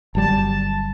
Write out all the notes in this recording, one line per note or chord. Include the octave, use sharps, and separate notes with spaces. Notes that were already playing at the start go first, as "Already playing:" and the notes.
G1 F#3 G3 A5